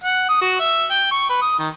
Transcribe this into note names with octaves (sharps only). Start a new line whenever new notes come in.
F#5
D#6
F#4
E5
G5
C#6
B4
D#6
D#3